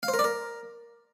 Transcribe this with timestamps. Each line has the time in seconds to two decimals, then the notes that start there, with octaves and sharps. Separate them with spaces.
0.03 F5
0.08 C5
0.14 A#4
0.19 D5
0.24 A#4